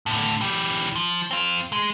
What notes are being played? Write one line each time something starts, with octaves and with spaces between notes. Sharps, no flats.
A2 D3
E3 G4
F3
C4 F4
G#3